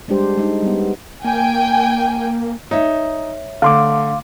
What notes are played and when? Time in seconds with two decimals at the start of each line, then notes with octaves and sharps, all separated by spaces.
0.08 G3 G#3 D4 G4 C5
0.37 G#3 D#4
0.62 G3 B3
1.25 A#3 G5 G#5
2.71 D#4 C#5 E5
3.62 D3 A3 F5 C6 D6